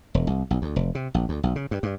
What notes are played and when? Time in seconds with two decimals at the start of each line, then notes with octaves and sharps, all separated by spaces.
0.14 E1
0.27 C2
0.51 B1
0.62 D2
0.76 F1
0.95 C3
1.14 A#1
1.29 D2
1.43 B1
1.56 C#3
1.71 G2
1.83 G2